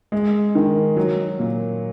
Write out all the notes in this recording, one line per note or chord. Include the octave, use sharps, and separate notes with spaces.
G#3
D#3
F#3
A#2